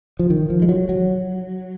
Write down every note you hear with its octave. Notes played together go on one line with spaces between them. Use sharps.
F3
D#3
F3
G#3
F#3
F#3